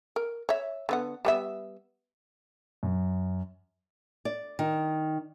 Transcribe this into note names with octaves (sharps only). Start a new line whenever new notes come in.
A#4
C#5 E5
D3 B3 F#5
G3 B3 E5
F#2
D5
D#3